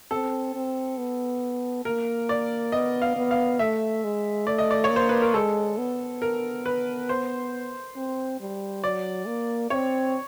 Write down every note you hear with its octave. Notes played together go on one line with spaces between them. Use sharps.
C4 A4
C4
B3
A#3 A#4
D5
B3 D#5
F5
B3
F5
A3 E5
G#3
A3 D5
D#5
D5
C#5
A#3
C5
B4
A#4
G#3 A4
B3
A#4
B4
C5
C4
G3
F#3 D5
A#3
C4 C#5